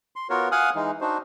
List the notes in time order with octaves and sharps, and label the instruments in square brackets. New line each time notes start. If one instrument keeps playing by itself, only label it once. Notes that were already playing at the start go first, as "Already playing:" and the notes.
[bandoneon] C6
B3 F4 F#4 A#4 C#5
F5 F#5 G#5 D#6 F6 F#6
E3 G#3 D#4
D4 D#4 F#4 C5